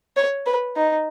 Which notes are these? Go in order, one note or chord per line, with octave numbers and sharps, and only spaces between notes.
C#5
B4
D#4